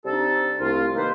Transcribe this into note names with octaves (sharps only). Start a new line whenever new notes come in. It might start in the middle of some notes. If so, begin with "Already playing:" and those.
C3 G3 D4 D#4 A4
C2 A3 F4
D#3 A#3 G4 B4 C5